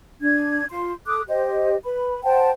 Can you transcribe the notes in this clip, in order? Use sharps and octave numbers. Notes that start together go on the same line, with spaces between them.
D4 G#6
F4 C6
A4 D6 D#6 F#6
G4 C5 D#5
B4 B5
C5 F#5 G5 A5